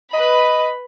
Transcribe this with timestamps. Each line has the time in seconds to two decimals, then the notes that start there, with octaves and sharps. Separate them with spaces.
0.14 B4 D#5 B5